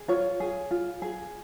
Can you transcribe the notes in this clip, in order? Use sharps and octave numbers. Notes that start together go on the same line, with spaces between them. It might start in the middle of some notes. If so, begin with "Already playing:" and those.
Already playing: G#4
F4 C#5
G#4
F4
G#4